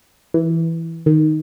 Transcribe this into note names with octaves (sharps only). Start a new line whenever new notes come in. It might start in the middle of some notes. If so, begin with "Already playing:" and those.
E3
D#3